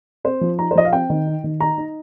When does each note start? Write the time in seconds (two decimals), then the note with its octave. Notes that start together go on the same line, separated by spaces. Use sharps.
0.24 C4 C5
0.41 F3
0.59 D#4 A#5
0.71 C5
0.75 F3 D#5
0.85 F5
0.93 C4 G5
1.10 D#3
1.26 D#4
1.44 D#3
1.60 D#4 A#5
1.78 D#4